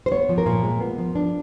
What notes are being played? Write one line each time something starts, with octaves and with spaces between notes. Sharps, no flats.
C5
B3 C#5
F3
A#4
A#2
G#3
B3
F3
D4